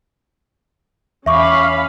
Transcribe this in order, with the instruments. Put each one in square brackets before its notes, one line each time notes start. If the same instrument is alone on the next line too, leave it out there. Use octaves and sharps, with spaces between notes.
[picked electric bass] E2 [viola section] C#4 F5 B5 [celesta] E5 C#6 D6